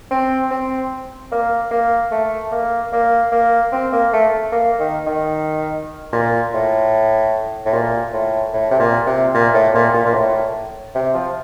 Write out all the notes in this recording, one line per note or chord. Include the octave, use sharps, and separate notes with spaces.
C4
C4
A#3
A#3
A3
A#3
A#3
A#3
C4
A#3
A3
A#3
D#3
D#3
A#2
A2
A2
A#2
A2
A2
C3
A#2
C3
A#2
A2
A#2
A#2
A#2
A2
C3
F3